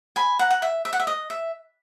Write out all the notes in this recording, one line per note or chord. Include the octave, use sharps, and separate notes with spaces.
G#5 B5
F#5 A#5
F#5
E5
E5
F#5
E5
D#5
E5